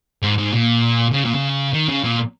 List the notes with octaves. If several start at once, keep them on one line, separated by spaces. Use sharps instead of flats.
G#2
G#2
A#2
C#3
A#2
C#3
D#3
C#3
A#2